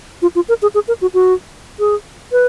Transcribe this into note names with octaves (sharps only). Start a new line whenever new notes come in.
F4
F4
A#4
G#4
G#4
A#4
F#4
F#4
G#4
B4